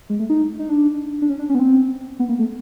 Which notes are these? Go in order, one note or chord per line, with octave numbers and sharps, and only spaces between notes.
G#3
A3
D#4
D#4
D4
D4
C#4
D4
C#4
B3
C4
B3
A#3
A3